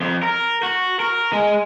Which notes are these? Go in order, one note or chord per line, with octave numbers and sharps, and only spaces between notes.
F2
A#4
F#4
A#4
G#3